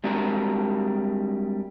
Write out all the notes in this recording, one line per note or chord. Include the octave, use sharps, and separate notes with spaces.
G3 G#3 C4 D4 F#4 A#4